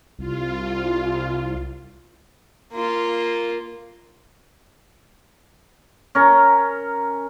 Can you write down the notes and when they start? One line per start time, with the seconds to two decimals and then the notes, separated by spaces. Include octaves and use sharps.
0.19 C2 F4
2.73 A#3 F4
6.15 C#4 A#4